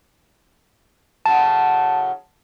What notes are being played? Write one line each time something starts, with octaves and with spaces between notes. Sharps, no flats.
A2 C#3 F#3 A5